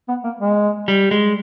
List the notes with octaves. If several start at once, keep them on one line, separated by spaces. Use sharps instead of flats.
B3
A#3
G#3
G3
G#3